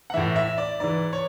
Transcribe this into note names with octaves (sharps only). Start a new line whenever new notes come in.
F#5
A2 E3 E5
E5
D5
G#2 E3 D5
C#5